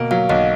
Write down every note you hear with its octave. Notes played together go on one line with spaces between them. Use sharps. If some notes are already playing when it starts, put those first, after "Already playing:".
Already playing: B2 A#3
F#3 F5
B1 D#5